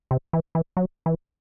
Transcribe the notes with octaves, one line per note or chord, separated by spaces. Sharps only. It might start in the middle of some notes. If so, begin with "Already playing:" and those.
C3
E3
E3
F#3
E3